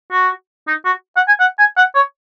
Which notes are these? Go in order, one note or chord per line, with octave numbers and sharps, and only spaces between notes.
F#4
D#4
F#4
F#5
G#5
F#5
G#5
F#5
C#5